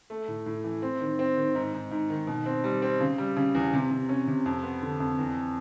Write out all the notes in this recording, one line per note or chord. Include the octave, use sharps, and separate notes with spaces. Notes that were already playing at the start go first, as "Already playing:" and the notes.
A3
A2
A2
E3
C4
D#3
C4
D#3
G#2
G#2
G#2
D#3
B2
C4
G3
C4
C#3
G3
C#3
E2
C3
C3
C#4
C3
F2
B3
D3
F2
E2